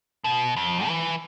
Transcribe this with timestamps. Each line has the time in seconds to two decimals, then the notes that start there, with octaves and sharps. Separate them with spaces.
0.24 B2
0.56 F2
0.87 E3